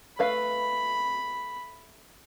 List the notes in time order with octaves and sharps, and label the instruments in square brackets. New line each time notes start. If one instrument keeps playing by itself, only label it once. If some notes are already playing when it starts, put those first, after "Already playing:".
[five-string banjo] A3 B4 F5 [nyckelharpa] B5